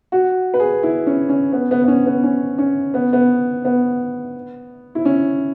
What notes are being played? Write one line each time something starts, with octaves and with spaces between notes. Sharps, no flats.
F#4
B4
G#4
E4
C#4
C#4
B3
B3
B3
C#4
B3
C#4
C#4
B3
B3
B3
E4
C#4